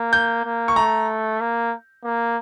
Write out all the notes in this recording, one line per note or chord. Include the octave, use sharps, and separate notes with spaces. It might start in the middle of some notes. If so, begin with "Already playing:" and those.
Already playing: A#3
G6
A#3
C#6
A3 A#5
A#3
A#3